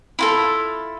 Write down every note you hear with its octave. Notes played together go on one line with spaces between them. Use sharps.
E4 F4 A4